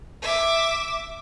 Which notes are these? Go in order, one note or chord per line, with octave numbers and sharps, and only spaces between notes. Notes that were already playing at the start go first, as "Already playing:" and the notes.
E5 D6